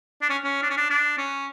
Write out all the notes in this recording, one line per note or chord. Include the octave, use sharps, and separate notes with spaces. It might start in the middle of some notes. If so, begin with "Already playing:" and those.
D4
C#4
C#4
D4
C#4
D4
D4
C#4